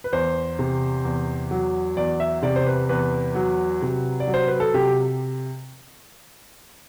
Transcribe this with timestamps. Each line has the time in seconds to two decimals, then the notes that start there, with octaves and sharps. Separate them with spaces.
0.04 B4
0.13 E2 C5
0.59 C3
1.05 E2
1.51 F#3
1.97 E2 D5
2.20 E5
2.43 C3 D5
2.56 C5
2.66 B4
2.89 E2 B4
3.35 F#3
3.82 C3
4.20 D5
4.27 F#3
4.34 C5
4.48 B4
4.60 A4
4.74 C3 G4